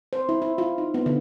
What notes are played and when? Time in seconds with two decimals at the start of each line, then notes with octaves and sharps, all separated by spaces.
0.13 C5
0.29 E4
0.42 E4
0.58 F4
0.78 D#4
0.94 B3
1.06 D3